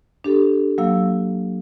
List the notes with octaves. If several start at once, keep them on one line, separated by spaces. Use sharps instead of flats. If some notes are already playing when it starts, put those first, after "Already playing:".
D4 G4 A4
F#3 A#3 F5 E6